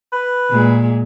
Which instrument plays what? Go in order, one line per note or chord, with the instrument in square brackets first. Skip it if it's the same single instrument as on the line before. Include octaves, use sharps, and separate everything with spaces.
[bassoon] B4
[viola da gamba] A#2 G#3